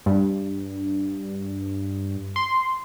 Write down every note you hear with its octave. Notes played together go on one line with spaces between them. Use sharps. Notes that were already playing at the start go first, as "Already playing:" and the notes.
G2
C6